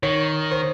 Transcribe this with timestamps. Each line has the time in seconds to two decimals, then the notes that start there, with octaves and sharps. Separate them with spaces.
0.03 D#3 C#5
0.51 C5